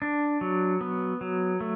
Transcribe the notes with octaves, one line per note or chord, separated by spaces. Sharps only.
D4
F#3
B3
F#3
A3